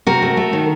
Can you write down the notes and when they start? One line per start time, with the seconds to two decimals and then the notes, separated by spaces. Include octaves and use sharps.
0.07 C3 F#4 A#4
0.22 A3
0.37 A3
0.53 D#3